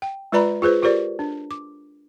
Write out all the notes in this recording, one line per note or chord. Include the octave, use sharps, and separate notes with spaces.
G5
G#3 F4 B4 D5 A#5 B5
F4 G#4 B4 C5
F4 G4 A#4 C5 D5
D4
D6